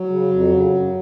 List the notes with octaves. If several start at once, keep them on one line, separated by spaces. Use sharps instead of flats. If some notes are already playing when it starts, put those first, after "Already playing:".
Already playing: F#3
C#3
F2
C#3
F#2